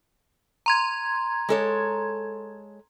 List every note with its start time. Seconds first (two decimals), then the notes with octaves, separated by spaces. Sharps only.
0.66 A#5 C6 G#6
1.49 G#3 A4 C#5